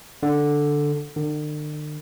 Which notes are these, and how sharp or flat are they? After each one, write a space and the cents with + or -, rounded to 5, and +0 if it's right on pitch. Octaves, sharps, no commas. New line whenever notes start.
D3 +0
D3 +45